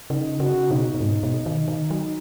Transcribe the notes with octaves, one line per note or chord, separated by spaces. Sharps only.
C#3 D#4
C#3 F#4
B2 D#4
B2
G#2
B2
D#3
D#3
F#3